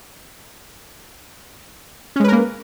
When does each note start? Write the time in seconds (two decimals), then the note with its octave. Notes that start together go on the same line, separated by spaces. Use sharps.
2.16 C#4
2.20 G#3
2.24 B4
2.28 A#4
2.32 A#3